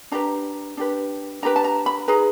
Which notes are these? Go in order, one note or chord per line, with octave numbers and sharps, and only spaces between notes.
D4 G4 B4 A#5
D4 G4 B4
D4 G4 B4 A#5
A5
A#5
B5
D#4 G#4 B4 A#5